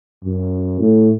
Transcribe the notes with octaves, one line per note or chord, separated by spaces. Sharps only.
F#2
A2